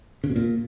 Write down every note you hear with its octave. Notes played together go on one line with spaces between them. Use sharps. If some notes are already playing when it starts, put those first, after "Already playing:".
C#3
B2
A#2